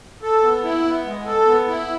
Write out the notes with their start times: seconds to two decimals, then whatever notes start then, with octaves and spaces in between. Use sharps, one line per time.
0.22 A4
0.43 B3
0.64 E4
0.85 B3
1.05 G#3
1.26 A4
1.46 B3
1.68 E4